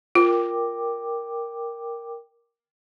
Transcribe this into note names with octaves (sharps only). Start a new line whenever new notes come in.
F4 A#4 G5 D6